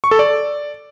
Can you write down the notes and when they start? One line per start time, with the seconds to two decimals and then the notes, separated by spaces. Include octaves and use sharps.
0.04 C#6
0.11 A4
0.19 D5